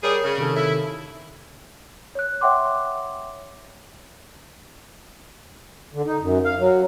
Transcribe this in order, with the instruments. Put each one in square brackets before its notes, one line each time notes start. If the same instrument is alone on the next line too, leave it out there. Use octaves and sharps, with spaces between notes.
[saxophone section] G3 G#4 [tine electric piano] A#4 C#5
[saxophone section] C#3
[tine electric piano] C3 D#3 A4
[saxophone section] E4
[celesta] C#5 F#6
C#5 E5 F#5 G5 C6 D6
[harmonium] D3
D#4
F#2
F5
F#3